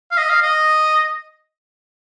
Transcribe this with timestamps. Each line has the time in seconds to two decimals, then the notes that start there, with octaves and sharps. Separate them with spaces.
0.12 F5
0.18 D#5
0.30 F5
0.42 D#5